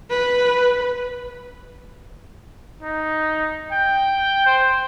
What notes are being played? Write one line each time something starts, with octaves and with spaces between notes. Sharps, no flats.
B4
D#4
G5
C5